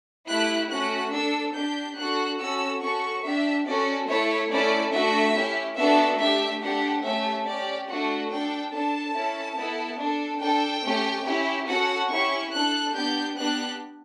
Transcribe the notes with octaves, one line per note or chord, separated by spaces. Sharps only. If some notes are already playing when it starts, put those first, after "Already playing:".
A3 E4 G4 F#6
A3 C#4 F#4 F#6
D4 A4 E6
D4 G4 G6
D4 F#4 A4 F#6
C#4 F#4 A4 E6
C#4 F#4 A4 C#6
D4 G4 E5
C#4 F#4 A4 D5
A3 E4 A4 C#5
A3 C#4 E4 A4 D5
A3 D4 F#4 A4 E5
C#4 E4 G4
B3 D4 F#4 A4 E5
A3 D4 G4 E5
A3 D4 G4 F#5
A3 C#4 G4 E5
C#4 G4 D5
A3 D4 F#4 A4 F#5
D4 A4 G5
D4 A4 A5
C#4 E4 A4
B3 E4 A4
D4
A4
D4 A4 G5
A3 C#4 G4
C#4 E4 G4
C#4 F#4 A4 F#5
C#4 E4 G4 C#6
D4 A4 F#6
B3 D4 G4 G6
B3 D4 G4 F#6